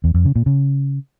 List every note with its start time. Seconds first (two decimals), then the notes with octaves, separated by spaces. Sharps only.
0.04 E2
0.14 F2
0.25 C#3
0.36 A#2
0.46 C#3